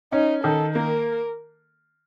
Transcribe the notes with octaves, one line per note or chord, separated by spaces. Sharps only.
C#4 D#4
D#3 A4
A#3 A#4